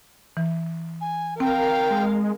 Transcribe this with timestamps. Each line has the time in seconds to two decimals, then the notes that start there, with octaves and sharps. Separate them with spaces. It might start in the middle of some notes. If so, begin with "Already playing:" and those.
0.37 E3
1.01 G#5
1.40 C4 A#4 F5 G5
1.90 G#3